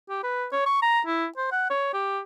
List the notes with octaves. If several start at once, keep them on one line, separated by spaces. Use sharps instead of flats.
G4
B4
C#5
C#6
A#5
E4
C5
F#5
C#5
G4